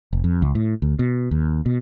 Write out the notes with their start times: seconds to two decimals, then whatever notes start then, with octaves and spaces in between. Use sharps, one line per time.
0.13 F1
0.24 F2
0.42 C#2
0.55 A2
0.82 D2
0.99 B2
1.31 D#2
1.66 B2